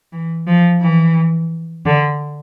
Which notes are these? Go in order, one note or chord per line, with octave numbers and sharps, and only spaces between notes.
E3
F3
E3
D3